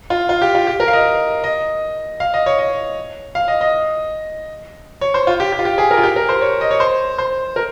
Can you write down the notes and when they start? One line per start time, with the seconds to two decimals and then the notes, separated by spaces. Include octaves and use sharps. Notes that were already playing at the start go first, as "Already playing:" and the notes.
0.10 F4
0.29 F4
0.42 G4
0.55 F4
0.67 G4
0.80 A#4
0.88 F5
0.93 D#5
1.44 D#5
2.20 F5
2.34 D#5
2.46 C#5
2.58 D#5
3.35 F5
3.48 D#5
3.61 D#5
5.01 C#5
5.14 C5
5.27 F4
5.40 G4
5.52 G4
5.59 F4
5.65 G4
5.78 G#4
5.91 A#4
5.97 F4
6.03 G4
6.16 A#4
6.29 C5
6.41 C#5
6.61 D#5
6.71 C#5
6.80 C5
7.18 C5
7.56 A#4